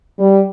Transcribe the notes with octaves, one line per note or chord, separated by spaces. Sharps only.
G3